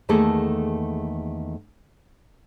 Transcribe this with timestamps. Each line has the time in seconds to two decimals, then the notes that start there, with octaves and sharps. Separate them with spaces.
0.09 E2 D#3 A3 A#3 G#4 A4